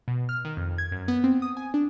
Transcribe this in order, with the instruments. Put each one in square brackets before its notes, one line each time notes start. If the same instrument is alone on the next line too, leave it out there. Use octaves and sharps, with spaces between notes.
[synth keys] B2
F6
D#3
F2
G#6
F#2
B3
C4
D#6
G#5
D4